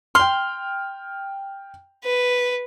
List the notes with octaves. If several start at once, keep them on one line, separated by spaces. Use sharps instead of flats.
G5 C6 F6
B4